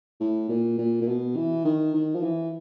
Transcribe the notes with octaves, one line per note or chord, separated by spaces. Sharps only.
A2
A#2
A#2
A#2
B2
E3
D#3
D#3
F3
E3